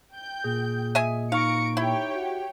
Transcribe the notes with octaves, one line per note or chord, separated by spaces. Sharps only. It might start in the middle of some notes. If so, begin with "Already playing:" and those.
G5 G6
A#2 G#4
D#5 E5 G#5
D#4 F5 C#6 A#6 C#7 D7
E4 G4 C#5 G5
F#4